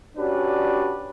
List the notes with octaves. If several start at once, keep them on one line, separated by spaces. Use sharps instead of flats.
C#4 D4 F#4 G4 B4 D5